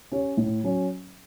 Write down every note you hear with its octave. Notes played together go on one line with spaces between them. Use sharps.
C#4 G4 C#5
A2
F#3 C#4